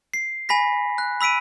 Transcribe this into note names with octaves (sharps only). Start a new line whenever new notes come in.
C7
G#5 B5 A#6 B6
F#6
B5 E6 B6 D7 D#7